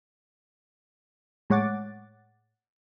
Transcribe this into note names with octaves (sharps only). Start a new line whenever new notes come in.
A2 G#3 C#5 F#5 D6 A6